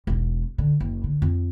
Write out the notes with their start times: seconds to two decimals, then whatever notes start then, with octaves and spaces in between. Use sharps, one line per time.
0.07 E1 B1
0.58 D3
0.80 F#1
1.04 D3
1.22 F2